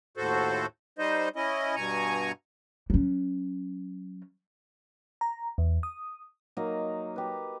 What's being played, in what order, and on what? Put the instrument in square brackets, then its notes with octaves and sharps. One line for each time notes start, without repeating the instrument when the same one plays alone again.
[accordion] D#2 A2 F#4 A4 C5
G3 D#4 C5 D#5
C#4 E4 D#5
G2 B2 G#5 A#5 C#6
[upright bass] F#3 C#4
[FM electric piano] A#5
E2
D#6
[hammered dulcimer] F#3 A#3 D#4 D#5
G4 B4